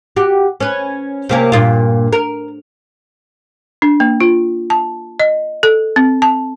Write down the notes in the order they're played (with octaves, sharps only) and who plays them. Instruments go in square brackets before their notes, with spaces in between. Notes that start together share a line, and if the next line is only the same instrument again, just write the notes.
[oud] F#4 G4
C#4 B4
C3 A#3 C#4
G2 A#2 F4
A#4
[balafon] D4
A#3
F4
A5
D#5
A4
C4
A5